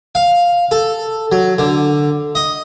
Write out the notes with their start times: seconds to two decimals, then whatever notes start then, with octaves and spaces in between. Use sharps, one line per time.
0.15 F5
0.71 A4
1.32 F#3
1.58 D3
2.35 D#5